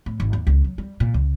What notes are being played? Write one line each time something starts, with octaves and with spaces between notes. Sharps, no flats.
A2
G#1
D#2
C#2
F#3
G3
A#2
C#2